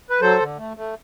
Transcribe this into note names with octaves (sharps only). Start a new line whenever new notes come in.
B4
F#3 A4 C5
D3
A3
A3